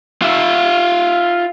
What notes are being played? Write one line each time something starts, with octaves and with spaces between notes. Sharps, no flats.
F4 E5